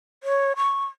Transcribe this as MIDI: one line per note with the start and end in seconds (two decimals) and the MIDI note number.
0.23 0.53 73
0.57 0.85 85